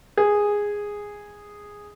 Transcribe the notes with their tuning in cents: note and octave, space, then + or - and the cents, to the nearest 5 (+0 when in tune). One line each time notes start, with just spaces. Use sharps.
G#4 -10